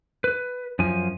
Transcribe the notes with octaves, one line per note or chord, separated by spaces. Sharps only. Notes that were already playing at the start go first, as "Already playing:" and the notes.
B4
F#2 F3 G#5